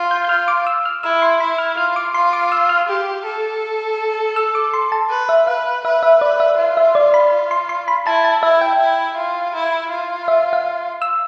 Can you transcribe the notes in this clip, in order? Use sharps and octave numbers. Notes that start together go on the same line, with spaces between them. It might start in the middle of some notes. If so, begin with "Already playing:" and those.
Already playing: F4
G6
G6
F4 F6
D6
E6
F6
E4 E6
C6
E4 B5
F6
F4 F6
D6
F4 C6
D6
E6
F6
G4
A4
E6
D6
C6
A5
B4
E5
B4 F5
B4 E5
E5
B4 D5
E5
F4
E5
D5
B5
C6
C6
B5
E4 A5
A5
E4 E5
G5
E4
F4
E4
F4
E5
F5
E6